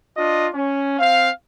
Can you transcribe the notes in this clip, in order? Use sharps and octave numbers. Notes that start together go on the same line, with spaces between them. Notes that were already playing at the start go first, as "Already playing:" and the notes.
D4 F4 D#5
C#4
C4 F5